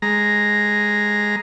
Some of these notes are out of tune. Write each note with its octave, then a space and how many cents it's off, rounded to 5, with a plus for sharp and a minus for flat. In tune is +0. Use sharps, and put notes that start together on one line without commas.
G#3 +0 A#5 +0